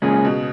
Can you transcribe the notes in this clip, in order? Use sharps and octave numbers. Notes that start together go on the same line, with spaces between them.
A#2 C#3 G#3 C#4 G#4
B2